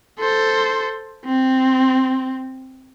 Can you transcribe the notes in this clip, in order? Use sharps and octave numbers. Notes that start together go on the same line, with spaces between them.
A4 C5
C4